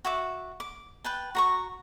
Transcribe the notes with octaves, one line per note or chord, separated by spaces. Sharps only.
F#4 E5 D6
D6
B4 G5 A5
F#4 A#5 C#6